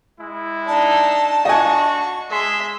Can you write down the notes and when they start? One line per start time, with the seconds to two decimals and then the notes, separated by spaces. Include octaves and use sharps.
0.19 G#3 E4
0.67 D4 D#4 A5
1.45 D4 F#4 D#5 G#5 C#6
2.30 G#3 G#4 E5 C6